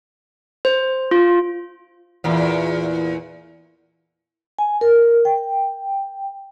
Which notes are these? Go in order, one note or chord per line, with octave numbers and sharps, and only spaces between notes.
C5
F4
E2 A#2
G#5
A#4
G5